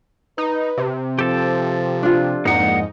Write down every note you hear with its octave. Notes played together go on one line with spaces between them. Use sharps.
D#4 B4
C3
F3 G4 A4 A5
D4 F4
F2 G#2 A#3 D#4 F#5